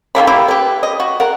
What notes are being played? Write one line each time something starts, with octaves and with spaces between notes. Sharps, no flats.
D#3 G3 A#3 B5
A#3 E4 G4
G4 B4
D#5
F#4
A#4 F#5